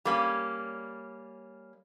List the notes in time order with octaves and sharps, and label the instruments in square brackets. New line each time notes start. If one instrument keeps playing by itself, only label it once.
[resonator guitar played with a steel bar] G3 A#3 C#4